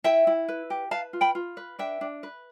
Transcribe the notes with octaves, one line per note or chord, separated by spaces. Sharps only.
E4 E5 G5
E4
B4
G4
B4 F5 A5
F4
G5 B5
F4
B4
D4 E5 G5
D4
B4